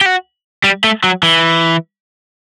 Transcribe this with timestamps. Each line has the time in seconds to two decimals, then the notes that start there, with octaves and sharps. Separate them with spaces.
0.01 G4
0.06 F#4
0.64 G3
0.84 A3
1.04 F#3
1.23 E3